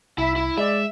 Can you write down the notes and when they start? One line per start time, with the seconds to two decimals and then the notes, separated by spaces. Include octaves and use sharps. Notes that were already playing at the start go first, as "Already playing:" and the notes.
0.18 C2 E4 E5
0.36 E4
0.58 G#3 D5 E5